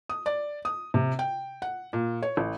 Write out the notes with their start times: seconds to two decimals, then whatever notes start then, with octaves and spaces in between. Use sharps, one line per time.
0.09 D#6
0.26 D5
0.65 D#6
0.94 C3
1.19 G5
1.62 F#5
1.93 A#2
2.23 C#5
2.37 A1